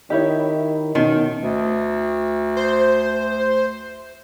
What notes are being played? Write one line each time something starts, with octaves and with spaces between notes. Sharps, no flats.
D#3 E4 G4 C#5 D#5
B2 D#3 C#4
D2
C5